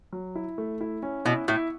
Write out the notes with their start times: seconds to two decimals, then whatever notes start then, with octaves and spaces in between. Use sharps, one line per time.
0.13 F#3
0.35 E4
0.58 A3
0.81 E4
1.03 C#4
1.25 B2 E4
1.48 A2 E4